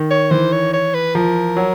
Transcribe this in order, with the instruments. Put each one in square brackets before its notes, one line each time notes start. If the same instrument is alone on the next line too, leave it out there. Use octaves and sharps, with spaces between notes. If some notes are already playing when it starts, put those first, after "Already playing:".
Already playing: [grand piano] D#3
[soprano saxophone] C#5
[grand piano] E3 [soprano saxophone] C5
[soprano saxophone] C#5
C#5
B4
[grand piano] F3 [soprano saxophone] A#4
[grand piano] F#3